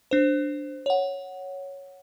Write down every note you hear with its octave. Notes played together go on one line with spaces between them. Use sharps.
D4 C5
C#5 F#5